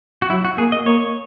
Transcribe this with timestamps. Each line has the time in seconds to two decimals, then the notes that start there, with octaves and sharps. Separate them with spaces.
0.22 F#4
0.30 F#3 E4
0.45 F#4
0.58 A#3 G#4
0.72 D#5
0.86 A#3 C#5